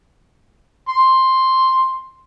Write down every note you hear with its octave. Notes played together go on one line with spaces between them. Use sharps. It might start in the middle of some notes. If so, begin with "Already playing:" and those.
C6